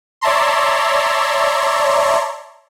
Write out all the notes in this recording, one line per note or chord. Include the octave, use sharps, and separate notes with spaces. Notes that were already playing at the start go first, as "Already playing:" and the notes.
C#5 D5 E5 A5 A#5 C6